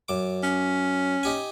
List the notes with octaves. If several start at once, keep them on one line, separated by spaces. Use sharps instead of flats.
F#2 D6
C#4
D#4 G4 G#5